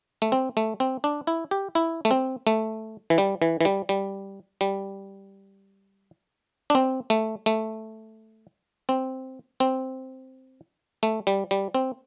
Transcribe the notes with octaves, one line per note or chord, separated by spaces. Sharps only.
A3
C4
A3
C4
D4
E4
G4
E4
A3
C4
A3
E3
G3
E3
E3
G3
G3
G3
D4
C4
A3
A3
C4
C4
A3
G3
G3
C4